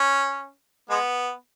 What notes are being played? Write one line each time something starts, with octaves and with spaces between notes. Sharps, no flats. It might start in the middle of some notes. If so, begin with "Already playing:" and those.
Already playing: C#4
G#3 B3